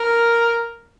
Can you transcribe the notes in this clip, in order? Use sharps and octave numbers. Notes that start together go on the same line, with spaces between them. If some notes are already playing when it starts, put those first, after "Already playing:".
Already playing: A#4